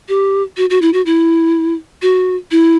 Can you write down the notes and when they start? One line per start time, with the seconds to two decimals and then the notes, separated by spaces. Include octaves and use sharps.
0.09 G4
0.57 F#4
0.70 F#4
0.82 E4
0.93 F#4
1.06 E4
2.02 F#4
2.51 E4